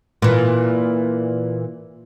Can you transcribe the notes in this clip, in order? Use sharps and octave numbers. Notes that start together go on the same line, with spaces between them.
A#2 E3